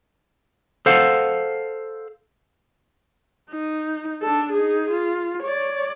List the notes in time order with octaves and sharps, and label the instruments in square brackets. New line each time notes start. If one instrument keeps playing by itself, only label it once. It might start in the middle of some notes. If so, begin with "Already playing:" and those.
[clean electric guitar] A4 C5 F5 F#5
[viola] D#4
D4 A4
D#4 G#4
F4
C#5 D5